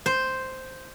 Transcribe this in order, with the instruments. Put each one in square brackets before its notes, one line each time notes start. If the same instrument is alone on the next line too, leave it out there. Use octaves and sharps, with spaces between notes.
[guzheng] C5